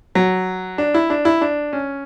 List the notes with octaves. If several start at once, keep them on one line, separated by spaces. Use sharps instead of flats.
F#3
D4
E4
D4
E4
D4
C#4